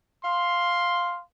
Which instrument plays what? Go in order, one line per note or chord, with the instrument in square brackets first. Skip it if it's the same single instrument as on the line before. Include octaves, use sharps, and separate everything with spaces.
[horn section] F5 C6